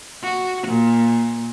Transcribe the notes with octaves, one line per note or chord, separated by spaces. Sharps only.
F#4
A#2